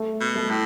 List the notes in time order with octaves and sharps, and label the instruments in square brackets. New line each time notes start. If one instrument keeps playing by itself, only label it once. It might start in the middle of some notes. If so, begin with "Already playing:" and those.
Already playing: [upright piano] A3
[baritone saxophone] B2
[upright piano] A3
[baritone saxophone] A2